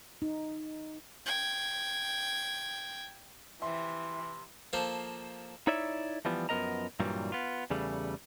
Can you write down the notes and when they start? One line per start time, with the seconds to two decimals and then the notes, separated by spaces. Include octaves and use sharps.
0.22 D#4
1.26 G5 G#6
3.62 C3 E3 F3 E5 C6
4.73 F3 A#3 A4 C5
5.67 D#4 E4 C#5 D5 E5
6.25 E3 F3 G3 B3
6.49 F#2 F3 B3 A#4 D#5 A#5
7.00 G2 A#2 E3 F#3 G3
7.32 B3 F4
7.70 E2 C#3 G3 A3